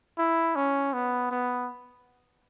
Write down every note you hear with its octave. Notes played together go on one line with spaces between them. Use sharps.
E4
C#4
B3
B3